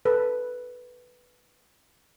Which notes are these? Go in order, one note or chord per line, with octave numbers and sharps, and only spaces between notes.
A4 B4